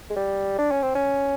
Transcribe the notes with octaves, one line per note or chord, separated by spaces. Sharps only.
G#3
G3
D4
C#4
C4
C#4